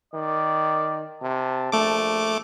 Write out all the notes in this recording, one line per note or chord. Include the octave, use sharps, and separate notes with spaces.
D#3 D5
C3 A5
A#1 A3 D6